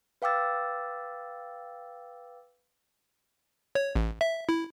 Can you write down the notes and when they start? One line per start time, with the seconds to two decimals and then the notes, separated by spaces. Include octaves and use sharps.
0.22 B4 F5 G5 D6 E6 A6
3.75 C#5
3.96 A1
4.21 E5
4.49 E4